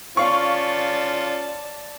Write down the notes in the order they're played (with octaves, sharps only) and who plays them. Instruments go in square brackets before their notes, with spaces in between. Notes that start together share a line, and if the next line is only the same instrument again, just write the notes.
[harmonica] C#4 F4 [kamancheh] D5 A5 [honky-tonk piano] F5 C#6